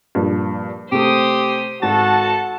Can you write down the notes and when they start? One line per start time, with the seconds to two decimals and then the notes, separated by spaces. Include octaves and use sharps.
0.15 G2 A#2 F3
0.92 C3 A3 G4 C5 D#6
1.83 G#1 F#4 A4 A5